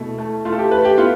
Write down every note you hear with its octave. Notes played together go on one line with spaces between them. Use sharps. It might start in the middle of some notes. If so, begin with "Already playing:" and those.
Already playing: B2 A3 E4
A3
A3 F4
A4
G4
A3 B4
G4
B3 F4